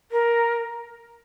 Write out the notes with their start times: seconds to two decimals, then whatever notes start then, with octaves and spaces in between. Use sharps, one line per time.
0.12 A#4